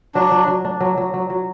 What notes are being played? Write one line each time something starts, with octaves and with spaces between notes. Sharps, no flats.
F#3 D4
F#3
F#3
D4
F#3
F#3
F#3
F#3